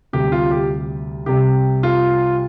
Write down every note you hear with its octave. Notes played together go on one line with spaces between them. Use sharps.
D2 C3 G3 G4
F4
G4
C2 C3 G3 G4
F4